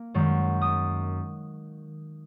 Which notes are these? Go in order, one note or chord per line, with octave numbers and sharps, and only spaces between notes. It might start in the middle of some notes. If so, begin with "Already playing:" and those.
Already playing: A#3
F#2 D#3 G#3
D#6